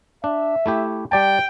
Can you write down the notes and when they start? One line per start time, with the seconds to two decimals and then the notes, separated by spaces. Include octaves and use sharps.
0.24 D4 E5
0.66 A3 E4 G4
1.12 G3 D5 G5 A5